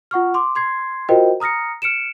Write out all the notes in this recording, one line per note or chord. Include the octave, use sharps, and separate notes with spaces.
F4 F#5 C#6 F6
C6 D6
C6 G#6 C7
F4 F#4 A#4 C5 D#5 G5
A#5 D#6 F6 A#6 C#7
F6 C#7 D7 E7